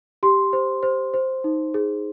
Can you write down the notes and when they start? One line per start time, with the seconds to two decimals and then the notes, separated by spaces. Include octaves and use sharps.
0.23 G4 C6
0.53 C5
0.83 C5
1.14 C5
1.44 D#4
1.74 G#4